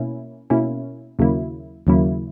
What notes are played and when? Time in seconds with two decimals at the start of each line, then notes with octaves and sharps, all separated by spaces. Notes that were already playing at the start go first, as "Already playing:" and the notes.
Already playing: B2 A#3 C#4 E4
0.50 B2 A#3 C#4 E4
1.19 D#2 C#3 F#3 A#3 E4
1.87 D#2 C#3 F#3 A#3 E4